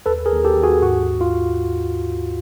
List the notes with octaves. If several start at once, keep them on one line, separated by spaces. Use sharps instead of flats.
D#2 A4 B4
G#4 A#4
D#2
G4 A4
D#2
F#4 G#4
G#2 F#4
G#2
F4